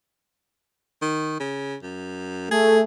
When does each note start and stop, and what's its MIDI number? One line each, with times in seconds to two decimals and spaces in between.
1.02 1.35 51
1.40 1.76 49
1.83 2.46 42
2.51 2.82 57
2.51 2.81 68